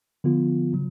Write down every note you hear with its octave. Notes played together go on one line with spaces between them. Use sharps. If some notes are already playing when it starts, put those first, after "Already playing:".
D3 F3 B3 F4
C#3 F#3